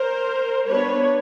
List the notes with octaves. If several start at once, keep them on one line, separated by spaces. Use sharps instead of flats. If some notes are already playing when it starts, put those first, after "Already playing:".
Already playing: A#4 C5
G3 B3 D4 B4 C#5